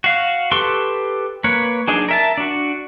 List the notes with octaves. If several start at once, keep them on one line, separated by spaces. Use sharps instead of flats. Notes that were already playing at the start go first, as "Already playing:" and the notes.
F#4 F5
G4 A4 B4 C6 C#6
A#3 B4 C#5
F#3 D4 D#4 G#4
A#4 E5 A5
D4 F#4